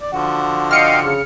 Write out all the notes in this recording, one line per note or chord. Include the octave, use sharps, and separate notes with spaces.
D5
D3 F3 F#4
D#5 F5 G5 F6 C#7
C#3